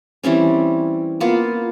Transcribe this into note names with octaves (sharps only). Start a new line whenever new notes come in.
E3 G3 C4 C#4
A#3 B3 F4